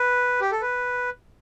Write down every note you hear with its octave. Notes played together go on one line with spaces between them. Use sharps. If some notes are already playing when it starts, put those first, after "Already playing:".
Already playing: B4
G4
A4
B4